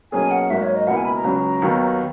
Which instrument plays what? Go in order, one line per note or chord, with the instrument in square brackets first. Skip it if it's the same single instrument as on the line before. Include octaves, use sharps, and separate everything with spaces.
[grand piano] B1 B2 A#3 C#4 G#4 [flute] G#5
[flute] F#5
[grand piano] G#1 G#2 F#3 A#3 [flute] E5
[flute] C#5
D#5
[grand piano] C#2 B2 A#3 E4 [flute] F#5
[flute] G#5
B5
A#5
[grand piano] C#2 C#3 F#3
D#2 D#3 F#3 B3